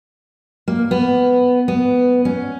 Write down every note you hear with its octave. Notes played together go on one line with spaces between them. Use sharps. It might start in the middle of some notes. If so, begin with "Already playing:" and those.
A#3
B3
B3
C#4